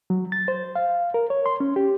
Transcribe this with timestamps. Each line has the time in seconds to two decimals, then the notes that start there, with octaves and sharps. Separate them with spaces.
0.10 F#3
0.32 A6
0.48 C5
0.76 F5
1.14 A#4
1.30 C#5
1.46 C6
1.60 C#4
1.76 G4